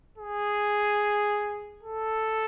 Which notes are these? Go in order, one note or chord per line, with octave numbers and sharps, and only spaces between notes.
G#4
A4